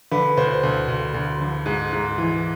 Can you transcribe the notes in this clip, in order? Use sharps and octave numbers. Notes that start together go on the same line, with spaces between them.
D3 B4
D2 C5
D2
D2
D2
D3
G#2
G#2
E3